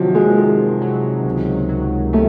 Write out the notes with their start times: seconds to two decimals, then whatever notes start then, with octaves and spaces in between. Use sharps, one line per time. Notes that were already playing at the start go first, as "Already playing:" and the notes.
Already playing: C3 D#3 F3 F#3
0.15 G#3
0.37 C3
0.82 F#3
1.25 C#2
1.69 F#3
2.13 D#3 A3